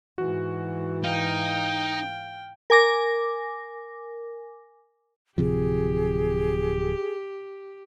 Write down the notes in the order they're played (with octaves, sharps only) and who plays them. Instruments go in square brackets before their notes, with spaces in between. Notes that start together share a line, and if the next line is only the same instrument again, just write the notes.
[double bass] G#2 E3 [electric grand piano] F#4
[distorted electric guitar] D#4 [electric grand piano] F5 [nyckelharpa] G5
[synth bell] A#4 G#5 D6 A#6
[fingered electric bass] D1 C3 F3 [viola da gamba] G4 [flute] G#4